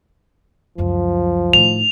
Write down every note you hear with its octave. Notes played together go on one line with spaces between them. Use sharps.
C#2 F#2 F3
A2 D#3 F7